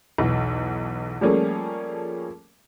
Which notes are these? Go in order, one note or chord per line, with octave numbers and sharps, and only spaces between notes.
B1 E2
F3 G3 A3 A#3 C#4 G#4